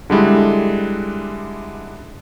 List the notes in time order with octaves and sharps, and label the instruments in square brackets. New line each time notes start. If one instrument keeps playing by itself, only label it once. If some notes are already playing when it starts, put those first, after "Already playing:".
[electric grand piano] D3 G3 G#3 E4